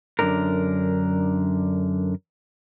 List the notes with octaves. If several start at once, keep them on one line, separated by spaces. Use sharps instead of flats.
F#2 A#2 D3 D4 A#4